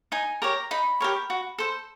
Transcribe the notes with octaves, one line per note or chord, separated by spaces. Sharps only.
D#4 G#5
G4 A#4 C#5 A#5
D#4 B5
G4 A#4 C#5
F#4
A4 C5